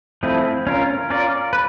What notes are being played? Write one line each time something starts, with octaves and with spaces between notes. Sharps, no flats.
F3 A3 C4 E4 G#4
C#4 F4 A#4
C#4 F4 A#4 D5
B4